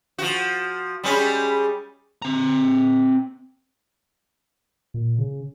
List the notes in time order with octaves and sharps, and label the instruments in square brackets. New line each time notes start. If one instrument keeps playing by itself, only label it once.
[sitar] F3 F#4
G3 G#3 C#4
[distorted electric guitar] C4 A#5
[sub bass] A#2
C#3